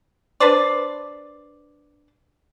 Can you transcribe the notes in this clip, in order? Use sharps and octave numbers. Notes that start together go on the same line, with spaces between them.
D4 B4 C5 D5